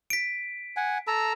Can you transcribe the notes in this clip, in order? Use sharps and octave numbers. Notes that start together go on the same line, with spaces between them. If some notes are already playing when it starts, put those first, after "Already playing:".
B6 D7
F#5 G#5
A4 A#5 E6